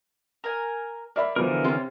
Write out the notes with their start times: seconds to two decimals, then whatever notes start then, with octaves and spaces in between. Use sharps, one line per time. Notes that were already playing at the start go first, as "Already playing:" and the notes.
0.44 A#4 G#5
1.16 A#3 D5 E5 B5
1.36 B2 D3 E3 F3 A#4
1.64 C3 C#4 F4